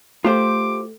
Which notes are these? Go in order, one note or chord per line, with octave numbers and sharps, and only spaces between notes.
A3 F4 G4 C5 D6